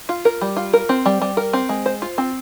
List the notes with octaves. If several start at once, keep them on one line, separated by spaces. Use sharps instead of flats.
F4
A#4
G3
F4
A#4
C4
G3
G3
A#4
C4
G#3
C5
F4
C4